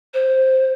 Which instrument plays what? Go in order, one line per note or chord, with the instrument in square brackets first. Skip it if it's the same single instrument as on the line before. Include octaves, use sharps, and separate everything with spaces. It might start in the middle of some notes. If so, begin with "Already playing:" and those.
[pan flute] C5